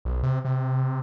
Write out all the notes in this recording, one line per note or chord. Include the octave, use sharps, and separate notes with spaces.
B1
C3
C3